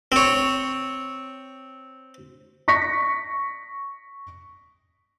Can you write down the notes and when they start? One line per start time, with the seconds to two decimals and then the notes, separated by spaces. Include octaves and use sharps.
0.12 C4 C#5
2.68 C#6 A#6 B6 C#7